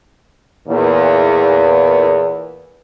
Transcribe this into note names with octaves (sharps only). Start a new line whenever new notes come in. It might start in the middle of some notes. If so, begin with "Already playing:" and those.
E2 A#2